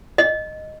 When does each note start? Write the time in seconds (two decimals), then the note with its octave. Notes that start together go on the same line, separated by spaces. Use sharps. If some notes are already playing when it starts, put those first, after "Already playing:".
0.18 D#5